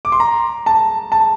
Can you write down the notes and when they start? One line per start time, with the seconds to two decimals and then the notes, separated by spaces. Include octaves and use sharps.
0.05 D6
0.12 C6
0.20 A#5
0.66 A5
1.12 A5